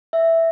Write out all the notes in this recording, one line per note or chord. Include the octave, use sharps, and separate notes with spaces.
E5